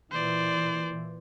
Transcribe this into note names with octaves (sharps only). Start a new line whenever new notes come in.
A#2 E3 C5 D5